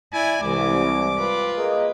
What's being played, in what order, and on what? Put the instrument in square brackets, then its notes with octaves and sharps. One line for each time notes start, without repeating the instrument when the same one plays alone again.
[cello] E4 D5 [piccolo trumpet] G#5
[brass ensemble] C2 [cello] E3 G#3 [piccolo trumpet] D6
[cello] F4 B4
[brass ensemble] A#3 G#4 D#5